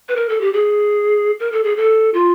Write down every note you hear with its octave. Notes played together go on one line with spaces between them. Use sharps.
B4
A#4
A4
G4
G#4
A#4
A4
G#4
A4
F4